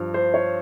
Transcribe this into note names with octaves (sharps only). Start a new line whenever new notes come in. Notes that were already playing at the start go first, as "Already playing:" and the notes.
Already playing: G2 F3
C5
C#5